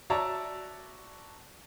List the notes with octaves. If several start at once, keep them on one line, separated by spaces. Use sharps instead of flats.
F#4 C#5 D5 E5 A5 A#5